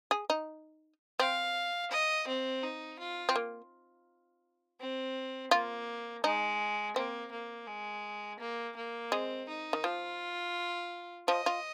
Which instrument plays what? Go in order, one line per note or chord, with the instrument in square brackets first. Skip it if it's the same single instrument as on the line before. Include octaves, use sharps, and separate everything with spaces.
[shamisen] G#4
D#4
[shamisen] C4 [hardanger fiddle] F5
[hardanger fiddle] D#5
C4
D#4
F4
[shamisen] C4
A#3
[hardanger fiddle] C4
[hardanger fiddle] A#3 [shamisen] F4
[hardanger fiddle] G#3 [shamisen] D#4
[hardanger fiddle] A#3 [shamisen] C4
[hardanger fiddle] A#3
G#3
A#3
A#3
[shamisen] G#3 [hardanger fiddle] C4
[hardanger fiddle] D#4
[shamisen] D#3
[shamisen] F3 [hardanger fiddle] F4
[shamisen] F3 [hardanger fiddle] D#5
[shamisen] F4